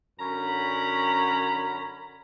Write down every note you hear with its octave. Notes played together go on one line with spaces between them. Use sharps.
F#2 D3 C#4 A#5 B5